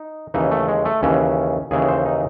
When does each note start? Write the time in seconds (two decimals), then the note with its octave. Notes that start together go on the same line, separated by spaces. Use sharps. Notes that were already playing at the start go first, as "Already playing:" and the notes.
Already playing: D#4
0.34 D#2 C#3 E3 D#4
0.51 A3
0.68 G#3
0.85 A3
1.03 D#2 C#3 E3 C#4
1.71 D#2 C#3 E3 G#4
1.88 C5
2.06 D#4